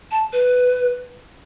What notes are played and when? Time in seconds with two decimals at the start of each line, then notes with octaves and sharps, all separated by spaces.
0.11 A5
0.33 B4